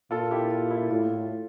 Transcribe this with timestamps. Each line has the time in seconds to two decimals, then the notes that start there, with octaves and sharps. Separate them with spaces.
0.11 A#2 F4 A4
0.31 E4 G4
0.50 F4
0.71 E4
0.91 A2 F4